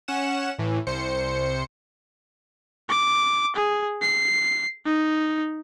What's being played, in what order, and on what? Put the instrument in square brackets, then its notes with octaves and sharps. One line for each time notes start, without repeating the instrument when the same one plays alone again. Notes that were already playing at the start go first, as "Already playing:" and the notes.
[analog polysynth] C#4 F#5 E7
A2 E3
C2 C5 C#7
[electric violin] D6
G#4
C7
D#4